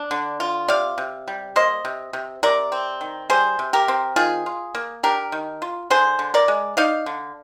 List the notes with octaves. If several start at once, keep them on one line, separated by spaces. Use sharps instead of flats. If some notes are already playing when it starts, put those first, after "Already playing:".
Already playing: D4
D3
F4
C3 D5 F5
C3
G3
A#3 C5 D#5
C3
C3
C3 A#4 D5
C4
D#3
G3 G#4 C5
C3
G4 A#4
C4
D#3 F4 G#4
F4
A#3
D4 G4 A#4
D#3
F4
D3 G#4 C5
D3
A#4 D5
G#3
D#4 D5 F5
D3